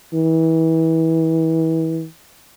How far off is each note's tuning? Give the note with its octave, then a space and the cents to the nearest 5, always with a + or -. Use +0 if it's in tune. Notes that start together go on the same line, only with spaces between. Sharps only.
E3 -30